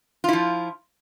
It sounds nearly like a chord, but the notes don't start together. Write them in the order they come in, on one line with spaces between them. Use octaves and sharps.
F4 E4 F3